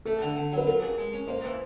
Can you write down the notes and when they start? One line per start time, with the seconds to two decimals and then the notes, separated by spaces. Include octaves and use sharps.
0.05 A3 A4
0.22 D3
0.37 D3
0.52 F#3
0.58 B4
0.66 F4 A#4
0.82 G#4
0.98 G#3
1.13 C#4
1.28 A#3 C5
1.44 E3